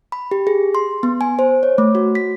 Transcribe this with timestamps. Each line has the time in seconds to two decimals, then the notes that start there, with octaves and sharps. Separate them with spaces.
0.12 B5
0.31 G4
0.47 G#4
0.75 C6
1.03 B3
1.21 G#5
1.39 C5
1.63 C#5
1.78 A3
1.95 F#4
2.15 B6